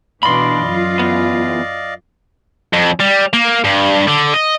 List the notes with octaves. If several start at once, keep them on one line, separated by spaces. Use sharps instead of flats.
B2 E3 D4 D5 D#5 F5 B5 C6
F#2 F4
E2 B3
F2
G3
A#3
G2
D3
D#5